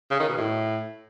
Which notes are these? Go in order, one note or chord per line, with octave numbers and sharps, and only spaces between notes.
C#3
D#3
B2
A2